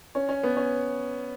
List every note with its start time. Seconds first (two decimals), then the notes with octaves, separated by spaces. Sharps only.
0.15 C#4
0.29 C#4
0.43 B3
0.56 C#4